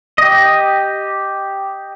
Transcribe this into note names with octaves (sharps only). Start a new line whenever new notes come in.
G4 D#5